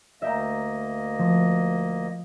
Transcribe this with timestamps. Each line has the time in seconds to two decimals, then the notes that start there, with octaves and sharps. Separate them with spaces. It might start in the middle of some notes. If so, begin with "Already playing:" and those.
0.22 D2 A#3 D#5 E5 G5 A#5
1.19 F3